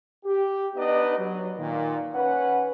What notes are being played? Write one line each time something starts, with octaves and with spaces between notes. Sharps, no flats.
G4
B3 D4 D#4 B4 D5 D#5
F#3
A#2 D#3
C#4 B4 F#5